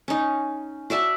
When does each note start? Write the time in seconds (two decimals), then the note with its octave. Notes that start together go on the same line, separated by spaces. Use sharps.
0.08 C#4 D#4
0.90 F#4 D5 E5 A5